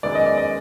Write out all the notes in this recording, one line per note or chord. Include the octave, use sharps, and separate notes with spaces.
F#2 D#3 G#3 B3 D5
D#5
D5
D#5